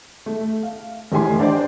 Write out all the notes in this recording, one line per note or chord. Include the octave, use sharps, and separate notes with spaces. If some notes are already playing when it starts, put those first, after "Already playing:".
A3
F5
F1 A2 E3 G4 G#5 C6
D4 C5 D5